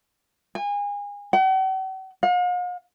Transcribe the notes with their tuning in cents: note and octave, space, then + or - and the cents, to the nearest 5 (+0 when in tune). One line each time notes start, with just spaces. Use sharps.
G#5 -30
F#5 +45
F5 +45